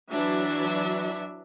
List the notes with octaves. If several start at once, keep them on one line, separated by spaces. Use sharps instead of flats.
E3 F#3 D4 E5